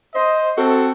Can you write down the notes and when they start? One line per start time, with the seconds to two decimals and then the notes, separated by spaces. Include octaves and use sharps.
0.14 C5 D#5
0.58 C4 F#4 A4